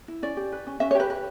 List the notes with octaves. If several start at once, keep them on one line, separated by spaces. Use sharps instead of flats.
E4
C#4 D5
G4
B4
C#4
C#4 E5
C#5
G4 B4
B4